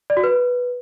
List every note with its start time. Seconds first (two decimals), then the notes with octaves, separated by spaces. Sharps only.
0.10 D5
0.17 F#4
0.24 B4